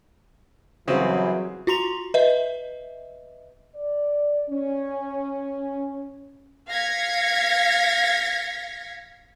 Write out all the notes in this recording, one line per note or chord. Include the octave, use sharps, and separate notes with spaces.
F#2 C#3 E3 F#3 G3 C4 F#4
F4 F#4 A#5 C6 F7
B4 D#5 E5
D5
C#4
F5 G#6 A#6 B6 C#7